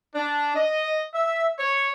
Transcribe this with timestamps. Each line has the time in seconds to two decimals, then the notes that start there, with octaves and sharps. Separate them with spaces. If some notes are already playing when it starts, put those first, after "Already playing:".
0.14 D4
0.55 D#5
1.14 E5
1.59 C#5